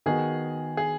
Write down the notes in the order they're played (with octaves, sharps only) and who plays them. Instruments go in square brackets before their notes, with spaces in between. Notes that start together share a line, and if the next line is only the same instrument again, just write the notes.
[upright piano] D#3 B3 F#4 [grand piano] G#4
[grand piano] G#4